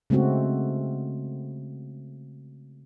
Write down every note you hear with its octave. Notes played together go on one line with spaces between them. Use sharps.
C#3 G#3 A3 C4 F#4